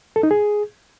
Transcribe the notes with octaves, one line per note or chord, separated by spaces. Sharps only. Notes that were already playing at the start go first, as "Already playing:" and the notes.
A4
D#4
G#4